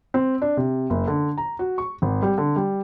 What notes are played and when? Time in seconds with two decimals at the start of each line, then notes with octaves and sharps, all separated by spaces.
0.14 C4
0.42 D4
0.57 C3
0.90 F#1
1.07 D3
1.38 A#5
1.59 F#4
1.78 C#6
2.02 G#1
2.22 G3
2.38 D3
2.56 G3